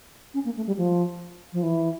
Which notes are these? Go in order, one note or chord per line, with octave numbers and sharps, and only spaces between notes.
C#4
A#3
A3
G3
F3
F3
E3